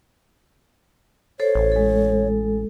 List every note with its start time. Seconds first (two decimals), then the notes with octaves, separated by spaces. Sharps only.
1.40 A4 C5 C#5
1.55 A1
1.72 G#3 A4